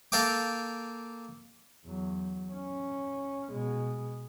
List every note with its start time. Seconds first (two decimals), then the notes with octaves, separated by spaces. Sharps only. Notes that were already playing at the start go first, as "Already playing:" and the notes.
0.12 A#3 A4 F5 G5 D6
1.85 E2 F#3
2.53 C#4
3.52 B2 G#3